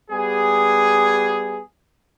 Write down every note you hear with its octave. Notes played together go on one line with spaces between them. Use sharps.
G3 B3 G#4